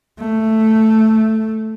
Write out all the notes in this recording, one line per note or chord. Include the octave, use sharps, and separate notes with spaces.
A3